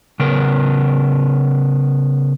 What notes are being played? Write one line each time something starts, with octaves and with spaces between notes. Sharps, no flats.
C#3 B3 A#4